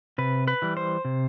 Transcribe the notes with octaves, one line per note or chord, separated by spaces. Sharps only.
C3 B4
B4
E3 G3
C5
C3